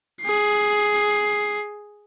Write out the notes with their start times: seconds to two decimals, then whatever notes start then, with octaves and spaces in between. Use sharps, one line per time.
0.22 G#4 C7